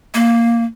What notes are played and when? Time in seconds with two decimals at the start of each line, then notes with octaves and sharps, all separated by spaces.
0.14 A#3